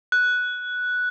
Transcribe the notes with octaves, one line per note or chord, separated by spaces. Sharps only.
F#6